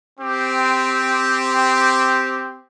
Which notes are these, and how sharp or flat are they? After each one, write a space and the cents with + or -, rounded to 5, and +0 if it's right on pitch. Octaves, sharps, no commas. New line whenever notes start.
C4 -10 G4 +0